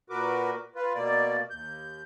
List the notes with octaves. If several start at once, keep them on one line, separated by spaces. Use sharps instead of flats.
A#2 F#4 A#4 B4 D6
F4 B4
B2 A#3 D5
D#2 G6